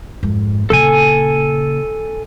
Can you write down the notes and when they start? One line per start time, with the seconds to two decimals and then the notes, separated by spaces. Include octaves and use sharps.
0.23 F2 G#2
0.70 A#2 C#3 A4 G#5